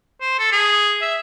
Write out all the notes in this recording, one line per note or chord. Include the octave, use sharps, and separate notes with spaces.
C5
A4
G#4
E5